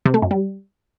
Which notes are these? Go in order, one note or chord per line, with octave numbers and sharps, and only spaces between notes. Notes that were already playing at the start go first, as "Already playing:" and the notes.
C3
A3
F#2
G3